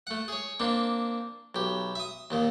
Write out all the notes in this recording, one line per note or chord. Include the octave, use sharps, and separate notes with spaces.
A3 F#5
G#4 C#5
A#3 C4 D4
B1 G4
E5 D#6
D#2 A#2 D#3